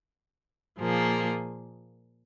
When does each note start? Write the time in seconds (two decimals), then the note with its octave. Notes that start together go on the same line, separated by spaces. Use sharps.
0.78 A#2 F3 A#3 G#4